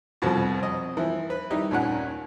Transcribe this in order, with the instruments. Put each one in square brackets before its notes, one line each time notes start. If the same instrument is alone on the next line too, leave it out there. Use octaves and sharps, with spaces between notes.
[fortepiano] C2 F2 B2 F3
C4 D#5
E3 F3
B4
D#3 G3 D#4 E4
D#2 A#2 C#4 F#5